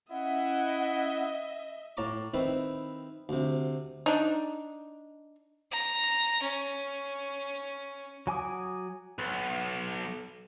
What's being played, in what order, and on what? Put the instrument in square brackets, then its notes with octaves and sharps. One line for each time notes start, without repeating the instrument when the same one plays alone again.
[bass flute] C#4 [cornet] E4 [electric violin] D#5 E5 [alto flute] F#5
[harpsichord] A2 C#5 A5 A#5 C#6 D6
D#3 C4 E4 B4
D2 C3
[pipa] D4 D#4
[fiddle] A#5
C#4
[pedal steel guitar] F#3 G#5 D6 D#6
[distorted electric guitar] B1